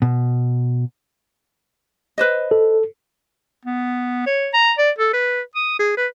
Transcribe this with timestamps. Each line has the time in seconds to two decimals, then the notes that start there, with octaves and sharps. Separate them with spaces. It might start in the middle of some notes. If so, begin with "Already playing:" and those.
0.02 B2
2.18 B4 C5 D#5
2.51 A4
3.65 B3
4.26 C#5
4.53 A#5
4.78 D5
4.99 A4
5.13 B4
5.56 D#6
5.79 G#4
5.97 B4